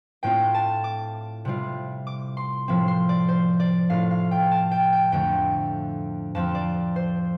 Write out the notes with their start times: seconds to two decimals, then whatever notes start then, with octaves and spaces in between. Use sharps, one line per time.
0.23 A2 A3 C4 F4 G5
0.54 A5
0.84 D6
1.45 C3 G3 F4
2.07 D6
2.37 C6
2.68 A2 F3 C4
2.88 C6
3.09 D5
3.28 C5
3.60 D5
3.90 A2 A3 F4 F5
4.11 F5
4.31 G5
4.51 A5
4.71 G5
4.92 G5
5.12 F2 D3 A3 G5
6.35 F2 F3 C4 F4 A5
6.55 D5
6.96 C5